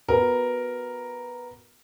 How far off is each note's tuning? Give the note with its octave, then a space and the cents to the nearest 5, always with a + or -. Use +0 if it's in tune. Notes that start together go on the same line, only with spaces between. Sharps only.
B3 +0 F#4 +0 A#4 +0